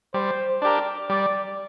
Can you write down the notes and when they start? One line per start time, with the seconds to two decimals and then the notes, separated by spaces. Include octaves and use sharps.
0.14 G3 C5
0.62 D4 G4 A#4 D5
1.09 G3 D5